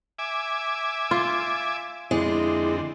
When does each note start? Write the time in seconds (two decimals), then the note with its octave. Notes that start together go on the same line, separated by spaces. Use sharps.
0.19 E5 G#5 D6
1.11 F4
2.11 F2 D3 G#3 C4 E4